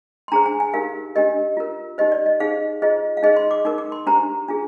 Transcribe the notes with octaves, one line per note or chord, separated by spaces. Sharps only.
C6
D4 G#4 C5 A#5
G#5
G#5
D#4 G4 A#4 F5
D4 G4 A#4 D#5
F4 A#4
D#4 G4 C5 D#5
D5
D#5
D#4 G#4 C5 F5
F4 G#4 C5 D#5
F5
D#4 G#4 C5 D#5
C6
D6
D#4 A#4 D6
D6
C6
D4 G4 C5 A#5
D4 F4 G#4